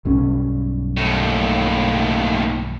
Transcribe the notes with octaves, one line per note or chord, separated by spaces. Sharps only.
B1 G2 C#4
D#2 A2